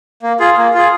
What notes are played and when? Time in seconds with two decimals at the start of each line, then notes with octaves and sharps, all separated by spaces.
0.23 A#3
0.40 F4 G#4
0.58 A#3
0.74 F4 G#4